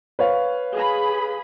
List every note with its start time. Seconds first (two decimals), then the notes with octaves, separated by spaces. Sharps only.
0.19 B4 C#5 F5
0.72 G#4 B5